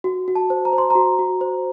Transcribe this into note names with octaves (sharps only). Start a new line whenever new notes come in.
F#4
F#4
A5
C5
A#5
C5
C6
F#4 A#5
F#4
C5